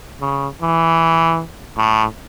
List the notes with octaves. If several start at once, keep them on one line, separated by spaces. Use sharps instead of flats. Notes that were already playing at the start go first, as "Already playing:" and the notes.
C#3
E3
A2